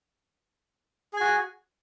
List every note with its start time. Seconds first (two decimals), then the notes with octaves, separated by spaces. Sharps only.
1.13 G#4
1.17 G#5
1.21 F#4